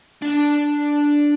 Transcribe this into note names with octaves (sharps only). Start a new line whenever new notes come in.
D4 A5